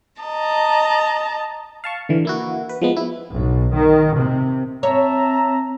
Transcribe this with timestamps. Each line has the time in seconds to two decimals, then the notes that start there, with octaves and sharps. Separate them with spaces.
0.21 D#5 A5 A#5
1.84 F5 A5 C#6
2.09 D3 E3
2.25 A#3 E4 F#4
2.69 B4
2.82 F3 G#3 B3
2.97 E4
3.33 B1
3.74 D#3
4.16 C3
4.83 C4 C#5 E5 A5 A#5